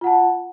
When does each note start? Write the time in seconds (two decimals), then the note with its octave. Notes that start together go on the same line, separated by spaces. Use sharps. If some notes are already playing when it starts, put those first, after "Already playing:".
0.01 F4
0.04 F#5
0.07 A5